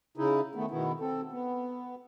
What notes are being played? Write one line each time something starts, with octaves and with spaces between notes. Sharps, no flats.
C#3 D#4 E4
D#3 A3 B3
B2 D#3 B3 E4
C4 A4
B3